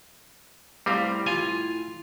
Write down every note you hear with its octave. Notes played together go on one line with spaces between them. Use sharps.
A2 G3 C4 E4 F5
F4 G#5